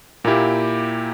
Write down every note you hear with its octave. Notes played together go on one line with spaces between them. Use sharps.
A#2 A#3 E4 G4